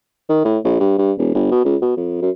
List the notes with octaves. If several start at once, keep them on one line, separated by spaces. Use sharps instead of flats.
D#3
A2
A#1
G2
G2
E1
G1
B2
C#2
B2
F2
F#2